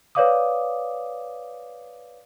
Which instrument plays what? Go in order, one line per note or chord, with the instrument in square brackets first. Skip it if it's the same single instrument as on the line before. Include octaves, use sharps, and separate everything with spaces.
[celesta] B4 C#5 D5 F5 D6 D#6